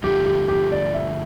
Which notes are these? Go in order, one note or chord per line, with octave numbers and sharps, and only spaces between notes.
G2 D3 F3 A3 G4
G4
G4
D5
E5